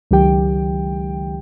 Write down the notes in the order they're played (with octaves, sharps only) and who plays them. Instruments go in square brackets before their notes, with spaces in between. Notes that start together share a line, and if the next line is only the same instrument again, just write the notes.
[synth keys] C#2 D#3 F#3 G4 G5